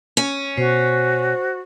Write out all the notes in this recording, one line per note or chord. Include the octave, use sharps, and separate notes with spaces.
C#4
B2 F#4 C5